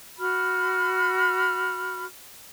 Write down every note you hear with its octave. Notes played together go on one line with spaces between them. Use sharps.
F#4 B5 F6